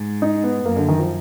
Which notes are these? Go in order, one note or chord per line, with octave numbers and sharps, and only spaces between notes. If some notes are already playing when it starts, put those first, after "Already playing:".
Already playing: G#2
D#4
B3
F#2 A#3
D3
D#3
F3